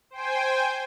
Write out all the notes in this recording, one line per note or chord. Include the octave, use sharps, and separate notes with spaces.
C5 G5 G#5